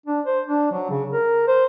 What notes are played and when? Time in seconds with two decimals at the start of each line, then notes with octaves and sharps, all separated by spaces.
0.06 D4
0.26 C5
0.47 D4
0.72 F#3
0.90 C#3
1.13 A#4
1.48 C5